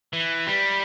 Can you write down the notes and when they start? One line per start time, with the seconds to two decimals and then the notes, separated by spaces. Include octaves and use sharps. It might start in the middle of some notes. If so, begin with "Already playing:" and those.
0.13 E3
0.47 G3